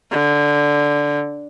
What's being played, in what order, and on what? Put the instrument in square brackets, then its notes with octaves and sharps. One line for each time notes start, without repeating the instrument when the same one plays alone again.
[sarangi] D3